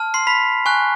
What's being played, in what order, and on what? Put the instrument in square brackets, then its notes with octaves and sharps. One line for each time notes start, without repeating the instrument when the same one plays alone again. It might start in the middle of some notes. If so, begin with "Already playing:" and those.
Already playing: [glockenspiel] A5 F6
C6 C7
B5 B6
G#5 C#6 F#6